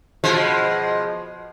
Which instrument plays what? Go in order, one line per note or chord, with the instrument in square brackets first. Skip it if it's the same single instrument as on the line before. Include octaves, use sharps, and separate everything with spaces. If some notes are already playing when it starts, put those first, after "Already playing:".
[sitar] B2 F3 G#3